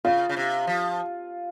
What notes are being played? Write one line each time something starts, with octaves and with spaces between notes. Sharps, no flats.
C#3 F4
C#3
C3
F3